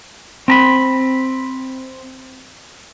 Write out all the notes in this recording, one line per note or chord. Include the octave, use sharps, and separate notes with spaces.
C4 A#5 B5